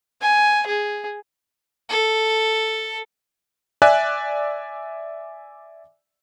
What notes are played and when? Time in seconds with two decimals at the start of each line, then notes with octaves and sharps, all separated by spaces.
0.21 G#5
0.67 G#4
1.89 A4
3.82 D5 E5 G#5 F#6